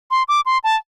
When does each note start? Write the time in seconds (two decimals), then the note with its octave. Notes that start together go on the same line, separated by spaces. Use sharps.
0.11 C6
0.28 D6
0.46 C6
0.64 A5